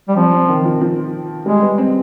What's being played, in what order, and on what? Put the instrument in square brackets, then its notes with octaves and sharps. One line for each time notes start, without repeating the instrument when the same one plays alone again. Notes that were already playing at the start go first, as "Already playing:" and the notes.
[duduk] G3
[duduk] F3 [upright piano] C4
[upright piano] C4
D#3
F3
F3
[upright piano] G3 [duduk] G#3
[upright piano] B3
C4